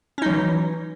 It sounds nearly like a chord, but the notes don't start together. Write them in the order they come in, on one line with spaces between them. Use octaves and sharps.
C#4 D#4 F#3 E3